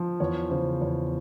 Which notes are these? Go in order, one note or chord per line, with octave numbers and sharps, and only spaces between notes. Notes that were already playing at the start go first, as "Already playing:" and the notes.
Already playing: F3
E2 C#5
C#3 C5
E2 C#5